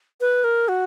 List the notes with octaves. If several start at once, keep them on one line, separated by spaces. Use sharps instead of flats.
B4
A#4
F#4